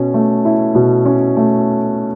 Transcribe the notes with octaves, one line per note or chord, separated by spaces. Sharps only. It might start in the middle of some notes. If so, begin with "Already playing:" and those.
Already playing: B2 C#4
A3
E4
B2
C#4
A3